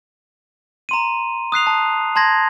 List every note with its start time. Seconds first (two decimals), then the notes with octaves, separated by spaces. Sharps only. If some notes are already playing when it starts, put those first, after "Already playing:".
0.89 A#5 C6 D#7
1.52 D#6 F#6 C7 F7
1.67 A5
2.16 A5 C6 G#6 A#6